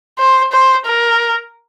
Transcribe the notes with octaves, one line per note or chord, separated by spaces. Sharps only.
C5
C5
A#4